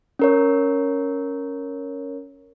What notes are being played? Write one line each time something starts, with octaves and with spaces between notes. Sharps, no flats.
C#4 A#4 C#5